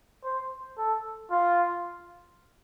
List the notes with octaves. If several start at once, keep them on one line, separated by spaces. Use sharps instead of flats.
C5
A4
F4